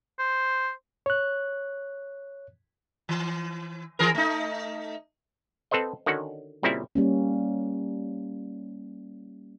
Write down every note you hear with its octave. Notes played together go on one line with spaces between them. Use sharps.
C5
C#5 F#6
E3
E3 G#4 A#4
A3 D#4
C4 A4 B4 C5 D#5
D3 D#3 C#4 F#4 F#5
A#2 C#3 G3 C4 E4
G3 A#3 C#4